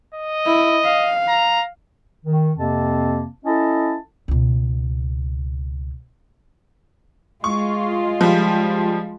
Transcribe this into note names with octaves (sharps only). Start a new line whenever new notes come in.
D#5
E4
F5
A#5
D#3
F2 C3 A#3 C4 A5
C#4 E4 A4 D#5 A5
C#2 B2
G#3 F4 C#6
F3 G3